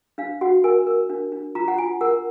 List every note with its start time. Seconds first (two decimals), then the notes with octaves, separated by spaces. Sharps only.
0.18 D4 F5
0.41 F#4 F#5
0.64 A#4 G#5
0.87 A#4
1.10 D4
1.32 D4
1.55 F4 A#5
1.68 F#5
1.78 F4 G#5
2.01 A#4 F#5